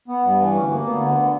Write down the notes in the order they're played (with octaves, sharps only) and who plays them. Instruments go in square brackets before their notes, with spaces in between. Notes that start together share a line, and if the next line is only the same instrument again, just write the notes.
[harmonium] B3
G2
E3
D2 C#4
A#3
D2 B3
D3